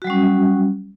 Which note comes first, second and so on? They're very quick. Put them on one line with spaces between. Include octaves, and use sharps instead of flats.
F#4 F#3 G3 C#4